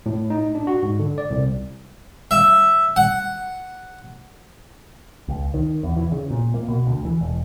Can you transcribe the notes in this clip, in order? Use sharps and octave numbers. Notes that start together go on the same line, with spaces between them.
A2
D#4
D4
F#4
G#2
D3
D5
C2
E5
F#5
C#2
D#3
E2
E3
C#3
A#2
A#3
B2
D2
E3
E1